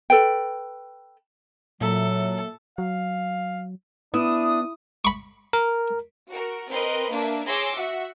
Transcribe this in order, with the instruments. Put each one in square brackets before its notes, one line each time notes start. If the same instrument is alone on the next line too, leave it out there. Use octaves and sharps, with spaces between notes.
[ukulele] A4 B4 G5
[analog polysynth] A#2 E5 [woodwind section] F#3 [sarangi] A4
[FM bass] F#3 [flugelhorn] F5
[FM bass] B3 [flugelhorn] D4 [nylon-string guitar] E4 [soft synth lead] D#6
[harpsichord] B5 C#6
[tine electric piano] A#4
[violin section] F#4 A#4
C4 A#4 B4 D#5 C6
A#3 D4 E5
G#4 C#5 C6 D6 E6 A#6
F#4 E5 F#5